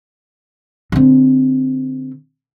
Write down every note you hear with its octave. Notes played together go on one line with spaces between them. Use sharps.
D3 C4